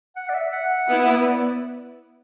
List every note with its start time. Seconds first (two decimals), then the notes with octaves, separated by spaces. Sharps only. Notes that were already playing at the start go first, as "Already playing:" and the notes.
0.16 F#5
0.29 D5
0.34 E5
0.53 F#5
0.89 B3 E4
1.25 D5
1.36 B4